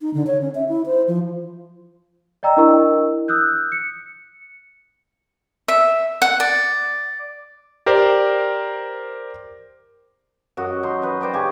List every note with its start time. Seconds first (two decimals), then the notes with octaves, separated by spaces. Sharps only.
0.01 D#4
0.14 D3
0.27 C#5
0.42 C#4
0.55 E5
0.68 E4
0.86 C5
1.08 F3
2.43 D5 D#5 G5 A#5 E6
2.57 D4 E4 A#4 D#5 C#6 E6
3.28 D#6 E6 F#6 G6
3.72 C#7
5.68 E5
6.22 F#5
6.40 D5
7.86 G4 A#4 C5 D5
10.57 F#2 F#3 F#4 D#5
10.83 D#4 C6
11.02 D#4 B4 D#5
11.21 C5 D5 G5 A#5
11.33 C#3 G4 G#5 C#6